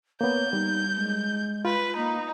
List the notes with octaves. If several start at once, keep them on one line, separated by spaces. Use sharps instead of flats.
A#3 B3 C#5 G6
G3 D#4
G#3
F4 B4
A#3 D#4